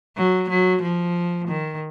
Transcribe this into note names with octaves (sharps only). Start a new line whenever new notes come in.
F#3
F#3
F3
D#3